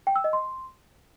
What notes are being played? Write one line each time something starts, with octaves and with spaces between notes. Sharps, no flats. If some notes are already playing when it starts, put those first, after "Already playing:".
G5
E6
D#5
C6